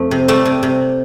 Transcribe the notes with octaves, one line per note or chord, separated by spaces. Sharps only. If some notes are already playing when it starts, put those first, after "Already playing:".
Already playing: F2 A3
C3
G3 A3
C3
C3